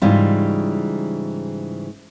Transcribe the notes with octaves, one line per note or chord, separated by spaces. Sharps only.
G#2 C#3 E3 G3 F4